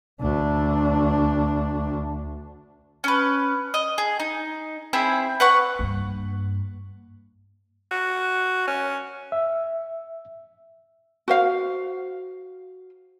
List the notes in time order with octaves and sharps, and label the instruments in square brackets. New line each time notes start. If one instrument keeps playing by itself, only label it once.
[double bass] D2 D4
[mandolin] C#4 B4
D#5
G#4
D#4
C4 E4 G#4 B5
B4 F#5 C#6
[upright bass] G2 A#3
[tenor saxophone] F#4
C#4
[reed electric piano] E5
[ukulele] F#4 C5 F5